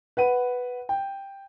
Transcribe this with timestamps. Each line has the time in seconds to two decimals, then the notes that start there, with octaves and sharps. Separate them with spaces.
0.17 B4 F#5 D#7
0.89 G5